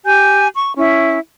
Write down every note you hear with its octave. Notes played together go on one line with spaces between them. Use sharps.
G4 G#5 G6
C#6
C#4 E4